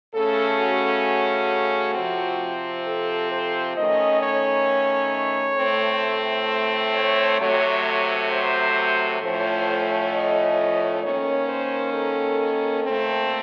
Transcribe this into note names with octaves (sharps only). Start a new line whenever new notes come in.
C#3 A3 C#4 A4
F#4
C3 F3 C4
A4
C5
D#3 A3 C#4 D#5
C#5
A2 A3 C4
C#5
C3 F#3 A3 C#5
C5
A2 F3 A3 C#4 C5
D#5
D#3 A#3 C#4 C#5
C5
A4
A#2 A3 C4